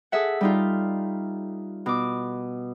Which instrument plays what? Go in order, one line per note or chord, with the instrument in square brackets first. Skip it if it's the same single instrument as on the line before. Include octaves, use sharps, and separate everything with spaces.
[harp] G#4 A4 E5 F#5
G3 D#4 F4
B2 D6